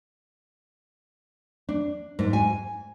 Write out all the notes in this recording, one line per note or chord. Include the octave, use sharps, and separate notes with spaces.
D4
G#2
G#5